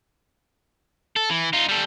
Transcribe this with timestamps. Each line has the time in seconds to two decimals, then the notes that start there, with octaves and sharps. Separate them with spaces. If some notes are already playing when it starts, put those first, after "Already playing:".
1.16 A4
1.30 E3
1.53 D#4 F4
1.69 G3 A4